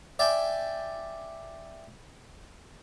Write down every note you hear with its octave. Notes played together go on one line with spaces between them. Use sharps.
D5 E5 G5 G#5